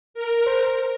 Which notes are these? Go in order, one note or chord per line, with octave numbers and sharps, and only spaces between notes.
A#4
C5